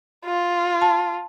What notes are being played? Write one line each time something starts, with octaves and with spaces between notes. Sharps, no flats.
F4
A5